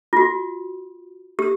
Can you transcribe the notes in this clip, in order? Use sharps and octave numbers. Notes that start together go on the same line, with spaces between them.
F4
F#4
G4